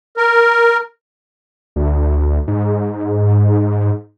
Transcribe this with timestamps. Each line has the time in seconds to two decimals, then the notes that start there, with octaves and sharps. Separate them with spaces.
0.17 A#4
1.76 D2
2.47 G#2